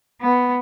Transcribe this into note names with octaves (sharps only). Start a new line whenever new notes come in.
B3